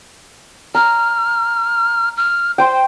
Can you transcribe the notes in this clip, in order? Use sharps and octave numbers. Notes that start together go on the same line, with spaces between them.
A#5 F6
F6
C5 G5 C6